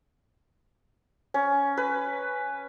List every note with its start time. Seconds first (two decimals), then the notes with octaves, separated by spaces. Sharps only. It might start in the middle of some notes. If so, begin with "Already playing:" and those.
1.34 C#4
1.77 B4